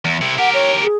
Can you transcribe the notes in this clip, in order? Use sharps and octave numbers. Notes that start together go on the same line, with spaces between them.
E2
C3 E4
G4 A#4 F#5
C#5
G#4